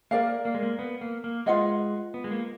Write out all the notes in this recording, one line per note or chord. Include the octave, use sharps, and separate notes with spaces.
A#3 A#4 D5 F5
A#3
G#3
A#3
B3
A#3
A#3
G#3 F4 B4 D#5 F#5
B3
G#3
A#3